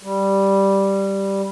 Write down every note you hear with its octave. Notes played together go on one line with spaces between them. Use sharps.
G3